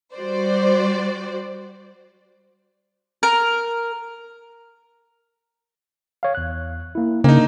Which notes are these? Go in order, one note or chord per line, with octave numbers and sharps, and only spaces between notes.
G3 F#4 C5 D5
A#4
C#5 F5
E2 F#6
A#3 E4
C#3 A#3 D4 D#4